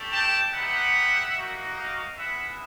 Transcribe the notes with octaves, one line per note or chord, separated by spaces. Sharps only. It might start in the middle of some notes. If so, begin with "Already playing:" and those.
Already playing: A3 D4 G4
G5 A5
B3 D#4 G4 E5 F#5
A#3 D#4 F#4
D#5 F5
G#3 B3 E4 E5 F#5